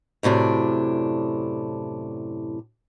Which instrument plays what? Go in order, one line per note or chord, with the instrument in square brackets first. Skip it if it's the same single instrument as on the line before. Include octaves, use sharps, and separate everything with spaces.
[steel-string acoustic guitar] F#2 A2 C3 D4